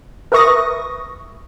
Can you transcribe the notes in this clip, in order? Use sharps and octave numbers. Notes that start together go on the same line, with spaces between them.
A#4 B4 E5 C#6 D#6 A#6